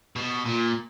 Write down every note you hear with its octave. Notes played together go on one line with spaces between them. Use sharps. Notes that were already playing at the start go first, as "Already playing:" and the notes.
B2
A#2